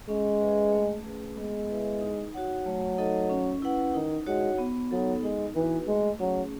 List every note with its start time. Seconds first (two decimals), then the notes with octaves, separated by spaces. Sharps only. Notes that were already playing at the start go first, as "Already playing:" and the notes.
0.08 G#3 C#4
0.40 G#4 B4 E5
0.72 A3
1.05 C#4 G#4 B4
1.37 G#3 B3
1.69 E4 B4 E5
2.01 D#4
2.34 F#4 C#5 F#5
2.66 F#3 A3
2.98 D#4 A4 D#5
3.30 C#4
3.62 E4 B4 F#5
3.94 D#3 D#4
4.27 G#3 F#4 C#5 F#5
4.58 B3
4.91 F#3 D#4 A4
5.23 G#3 D#4
5.55 E3 F#4 B4
5.87 G#3 A3
6.19 F#3 C#4 G#4